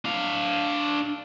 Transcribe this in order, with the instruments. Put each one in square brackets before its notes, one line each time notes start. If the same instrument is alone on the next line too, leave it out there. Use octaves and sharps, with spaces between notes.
[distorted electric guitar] D4 F5